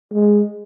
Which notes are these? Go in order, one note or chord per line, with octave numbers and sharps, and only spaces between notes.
G#3